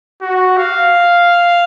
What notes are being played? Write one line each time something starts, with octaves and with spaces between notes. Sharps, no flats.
F#4
F5